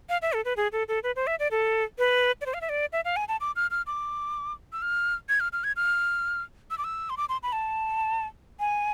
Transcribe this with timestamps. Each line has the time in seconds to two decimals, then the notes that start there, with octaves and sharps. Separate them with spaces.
0.09 F5
0.22 E5
0.33 A4
0.45 B4
0.57 G#4
0.72 A4
0.88 A4
1.03 B4
1.16 C5
1.27 E5
1.39 D5
1.51 A4
1.99 B4
2.41 D5
2.46 C5
2.54 F5
2.61 E5
2.69 D5
2.93 E5
3.05 F5
3.16 G#5
3.28 A5
3.41 D6
3.56 F6
3.71 F6
3.87 D6
4.73 E6
4.82 F6
5.29 G#6
5.40 F6
5.53 F6
5.64 G#6
5.76 F6
6.71 E6
6.78 D6
6.84 E6
7.10 C6
7.17 D6
7.29 C6
7.43 B5
7.53 A5
8.60 G#5